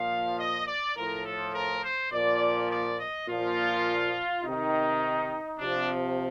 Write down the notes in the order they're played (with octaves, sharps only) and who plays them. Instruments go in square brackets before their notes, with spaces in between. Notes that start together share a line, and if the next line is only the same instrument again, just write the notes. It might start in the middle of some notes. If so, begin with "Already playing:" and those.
Already playing: [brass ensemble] A#2 F3 F5
D#5
D5
A2 F3 A#4
A4
A#4
C5
A#2 F3 D5
D5
D#5
A#2 F3 F4
C3 D#3 D#4
C3 F3 D4